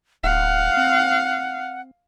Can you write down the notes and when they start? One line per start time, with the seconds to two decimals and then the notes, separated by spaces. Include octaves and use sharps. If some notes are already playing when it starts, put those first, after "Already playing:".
0.23 D1 F5 F#5
0.77 C4